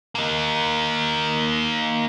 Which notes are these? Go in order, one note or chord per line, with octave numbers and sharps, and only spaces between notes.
A#3 D#4